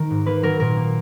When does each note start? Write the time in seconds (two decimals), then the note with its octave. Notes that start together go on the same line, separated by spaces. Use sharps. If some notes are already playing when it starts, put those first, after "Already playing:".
Already playing: D#3 A#4
0.10 G#2
0.26 A#3 B4
0.43 F#3 A#4
0.60 A#2 A#4
0.77 A#3